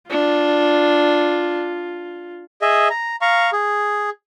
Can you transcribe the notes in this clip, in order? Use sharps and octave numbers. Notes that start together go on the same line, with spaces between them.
D4 F4
G#4 D#5 E5
A#5
F5 A#5 C#6
G#4